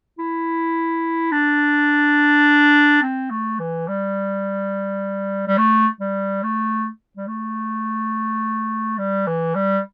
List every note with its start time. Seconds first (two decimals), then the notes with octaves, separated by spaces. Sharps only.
0.19 E4
1.32 D4
3.03 C4
3.31 A3
3.59 E3
3.88 G3
5.48 G3
5.58 A3
6.00 G3
6.43 A3
7.17 G3
7.28 A3
8.98 G3
9.27 E3
9.55 G3